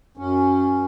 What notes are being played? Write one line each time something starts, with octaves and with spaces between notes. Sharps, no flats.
F#2 C#4